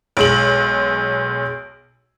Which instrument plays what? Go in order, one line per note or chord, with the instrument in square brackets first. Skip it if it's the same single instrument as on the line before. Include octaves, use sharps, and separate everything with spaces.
[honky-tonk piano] B1 G#3 F#7